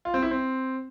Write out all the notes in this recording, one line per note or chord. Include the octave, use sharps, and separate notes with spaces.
F4
C4
E4
C4